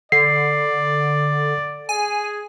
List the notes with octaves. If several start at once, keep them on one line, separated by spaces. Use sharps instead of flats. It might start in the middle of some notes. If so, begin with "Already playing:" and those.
D3 D5 C7
G#4 G#5